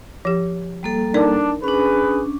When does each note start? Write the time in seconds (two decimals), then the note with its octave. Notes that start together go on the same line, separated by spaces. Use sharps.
0.25 F3 G4
0.83 G3 A#3 A4
1.14 D4 D#4 A#4 D5
1.64 C#4 D4 G#4 B4